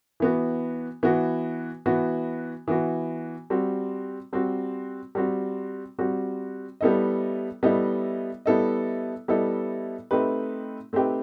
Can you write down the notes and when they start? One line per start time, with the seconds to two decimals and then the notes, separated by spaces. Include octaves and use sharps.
0.20 E3 B3 F#4
1.03 E3 B3 F#4
1.86 E3 B3 F#4
2.68 E3 B3 F#4
3.50 G3 C4 F#4
4.33 G3 C4 F#4
5.15 G3 C4 F#4
5.99 G3 C4 F#4
6.81 G3 B3 E4 A4 D#5
7.63 G3 B3 E4 A4 D#5
8.46 G3 B3 E4 A4 D#5
9.28 G3 B3 E4 A4 D#5
10.11 A3 C4 D#4 G4 B4
10.93 A3 C4 D#4 G4 B4